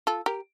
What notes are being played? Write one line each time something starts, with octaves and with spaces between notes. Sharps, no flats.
F4 A4
G4 A#4